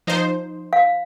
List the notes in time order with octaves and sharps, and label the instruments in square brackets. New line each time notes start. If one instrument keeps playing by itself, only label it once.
[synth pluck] F3 D#4 C5
[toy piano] F5